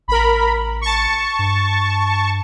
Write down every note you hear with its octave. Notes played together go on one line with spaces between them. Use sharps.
A1 A#4 B5
A5 C#6
G2